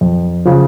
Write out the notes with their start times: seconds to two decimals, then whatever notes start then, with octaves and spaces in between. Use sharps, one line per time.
0.01 F2
0.45 C#3 F3